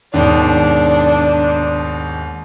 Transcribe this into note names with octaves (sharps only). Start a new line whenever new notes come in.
D#2 G#2 B2 D4